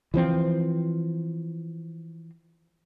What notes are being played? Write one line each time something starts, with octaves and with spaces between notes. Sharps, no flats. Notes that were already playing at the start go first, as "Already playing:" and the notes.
E3 F3 C4